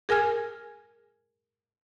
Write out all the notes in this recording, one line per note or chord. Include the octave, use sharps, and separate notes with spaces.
G#4 A#4 G#5 F6 G#6